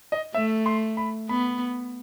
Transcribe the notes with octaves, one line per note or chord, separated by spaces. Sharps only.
D#5
A3 E5
C6
B5
B3 B5